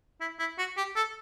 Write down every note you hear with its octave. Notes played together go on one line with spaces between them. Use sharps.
E4
E4
F#4
G4
A4